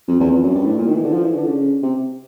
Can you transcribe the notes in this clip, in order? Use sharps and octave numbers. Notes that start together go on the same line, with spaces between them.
F2
E2
F2
F#2
G2
A2
A#2
D#3
E3
D3
F3
E3
D3
C#3
C3